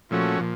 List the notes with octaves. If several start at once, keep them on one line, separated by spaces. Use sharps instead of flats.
A#2 F3 A3 C#4 F#4
A#2